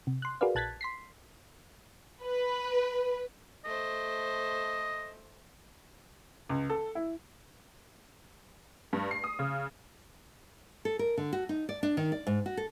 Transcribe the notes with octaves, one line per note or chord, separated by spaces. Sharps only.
C3
C6 F#6
F#4 G#4 A#4 B4 D5 F5
A#1 A5 F#6 G#6 A6 B6
C6 B6 C7
B4
A3 C5 D#5
C#2
A4
E4
G2
C7
D#6
C#3
A4
A#4
D3
F#4
D#4
D5
D4
D#3
D5
G#2
F#4
A4